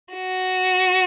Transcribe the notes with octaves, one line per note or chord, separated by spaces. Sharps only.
F#4